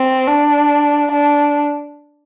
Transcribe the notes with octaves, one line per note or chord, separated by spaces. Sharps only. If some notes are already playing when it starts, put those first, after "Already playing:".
Already playing: C4
D4
D4